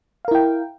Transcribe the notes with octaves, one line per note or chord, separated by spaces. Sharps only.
E4 A#4 F5 G5